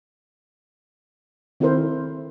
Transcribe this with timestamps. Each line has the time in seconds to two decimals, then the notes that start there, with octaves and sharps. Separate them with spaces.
1.60 D#3 C4 E4 A4 A#4 C5